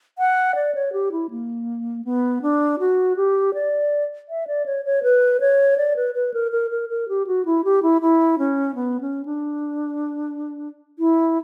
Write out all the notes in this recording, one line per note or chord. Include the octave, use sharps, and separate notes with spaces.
F#5
D5
C#5
G4
E4
A#3
B3
D4
F#4
G4
D5
E5
D5
C#5
C#5
B4
C#5
D5
B4
B4
A#4
A#4
A#4
A#4
G4
F#4
E4
G4
E4
E4
C#4
B3
C#4
D4
E4